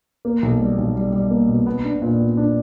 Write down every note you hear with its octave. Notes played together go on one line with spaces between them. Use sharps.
A#3
B1
G3
B1
G3
G3
A#3
B2
B3
D4
A#2
B3
D4